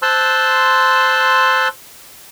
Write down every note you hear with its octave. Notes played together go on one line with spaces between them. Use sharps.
C5 A5 C6 E6 F#6